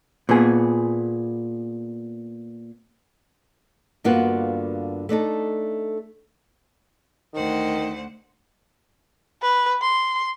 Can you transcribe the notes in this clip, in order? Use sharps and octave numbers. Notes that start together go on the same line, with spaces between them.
A#2 B3 G#4
G2 D3 A#3 B3 F4 F#4
A3 D4 D#4 A4
D2 D#3 C5 F#5
B4
C6